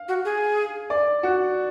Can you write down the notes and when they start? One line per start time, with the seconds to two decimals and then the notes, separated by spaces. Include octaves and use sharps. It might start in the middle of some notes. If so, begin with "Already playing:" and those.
Already playing: F5
0.08 F#4
0.25 G#4
0.90 D5
1.23 F#4